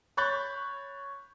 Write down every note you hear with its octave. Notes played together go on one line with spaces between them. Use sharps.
C#5 B5 C#6 F#6 G6 A6